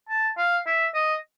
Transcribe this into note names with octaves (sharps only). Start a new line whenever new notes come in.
A5
F5
E5
D#5